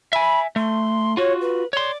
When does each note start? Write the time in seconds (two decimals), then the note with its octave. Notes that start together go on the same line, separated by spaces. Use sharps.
0.13 E5 G#5 B5
0.56 A3 C6
1.17 F4 F#4 C#5
1.41 B4
1.73 C#5 D5 C6